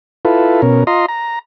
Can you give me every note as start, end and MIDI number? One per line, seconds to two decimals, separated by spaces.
0.25 0.61 64
0.25 0.61 65
0.25 0.61 69
0.25 0.61 71
0.62 0.84 47
0.62 0.84 61
0.62 0.84 70
0.87 1.06 65
0.87 1.06 75
0.87 1.06 82
0.87 1.06 84
1.08 1.39 82